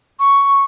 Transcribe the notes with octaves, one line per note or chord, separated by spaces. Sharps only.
C#6